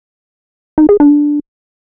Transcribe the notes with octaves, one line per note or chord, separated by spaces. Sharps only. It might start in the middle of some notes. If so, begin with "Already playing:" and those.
D#4
G#4
D4